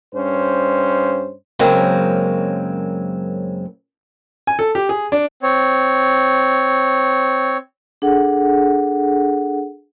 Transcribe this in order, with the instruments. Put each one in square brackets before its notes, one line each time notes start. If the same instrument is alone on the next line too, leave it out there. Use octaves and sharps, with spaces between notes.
[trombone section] G2 C#4 C5
[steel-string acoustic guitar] F#2 C#3 F#3 G#3 A#3 C4
[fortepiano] G#5
A4
G4
G#4
D4
[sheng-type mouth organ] C4 C#5
[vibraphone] D4 G#4 A4 F#5